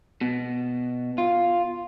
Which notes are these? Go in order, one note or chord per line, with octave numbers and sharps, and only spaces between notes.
B2
F4